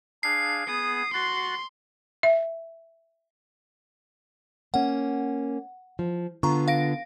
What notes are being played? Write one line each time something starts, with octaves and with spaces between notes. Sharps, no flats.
D4 G#4 F5 C7
B3 G#4 D#6
F#4 C6 F#6 A6
E5
A#3 C#4 F#5
F3
D3 B3 F4 A#5 C#6
F5 A#6 D7